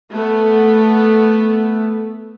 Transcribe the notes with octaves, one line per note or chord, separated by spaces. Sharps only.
A3 B3